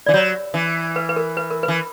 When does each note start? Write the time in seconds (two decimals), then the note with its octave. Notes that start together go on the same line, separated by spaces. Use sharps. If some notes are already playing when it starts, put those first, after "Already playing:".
0.06 E3 D5
0.14 F#3 C#5
0.54 E3
0.96 B4
1.09 B4
1.16 A#4
1.37 B4
1.51 A#4
1.63 B4
1.68 E3